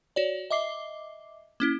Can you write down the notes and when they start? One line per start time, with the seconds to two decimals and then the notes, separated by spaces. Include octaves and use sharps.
0.16 F#4 C#5 D5
0.50 D#5 E5 D6 C7 G7
1.60 A#3 C#4 E4 G7